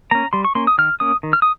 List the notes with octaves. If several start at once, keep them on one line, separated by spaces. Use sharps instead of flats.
A#3 C#4 A#5
G3 C6
C#6
A#3 C#4 C6
D#6
D#3 F6
A#3 C#4 D#6
D#3
F6
D#6